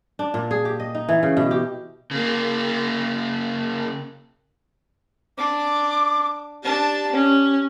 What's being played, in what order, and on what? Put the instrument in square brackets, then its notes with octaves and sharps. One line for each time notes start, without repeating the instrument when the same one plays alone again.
[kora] D4
A#2
G#4
G4
D#5
D#4
E3
C#3
B2
G4
[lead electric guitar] C#3 A#3
[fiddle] D4 [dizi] D6
[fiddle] D4 A5 [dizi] G4
[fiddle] C#4